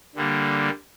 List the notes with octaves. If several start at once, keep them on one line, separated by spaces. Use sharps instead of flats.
D3 G3 A#3